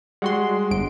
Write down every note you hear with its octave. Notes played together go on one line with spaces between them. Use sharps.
G3 G#3 F#4 G#4 F#5 C6
G1 D7